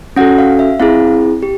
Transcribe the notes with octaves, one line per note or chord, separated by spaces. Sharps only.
C#4 F#4 A4 F#5
F5
E5
C4 E4 G#4 F5
G4